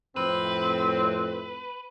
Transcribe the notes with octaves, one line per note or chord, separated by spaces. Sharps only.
F2 A2 C4 B4